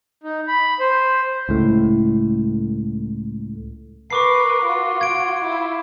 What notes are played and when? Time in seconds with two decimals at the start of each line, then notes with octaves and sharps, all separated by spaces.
0.24 D#4
0.48 B5
0.80 C5
1.49 C#2 A2
4.10 A#4 B4 C#6 D6 C7
4.65 F4 F#4
5.01 G#6 D7
5.44 E4 F4